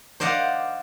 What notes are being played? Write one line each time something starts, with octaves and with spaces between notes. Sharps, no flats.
C5 D5 D#5 F5 F#5